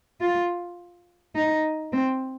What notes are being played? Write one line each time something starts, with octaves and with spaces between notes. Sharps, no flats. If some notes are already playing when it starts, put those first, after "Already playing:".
F4
D#4
C4